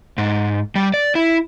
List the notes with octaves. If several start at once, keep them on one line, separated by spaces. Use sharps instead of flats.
G#2
G3
D5
E4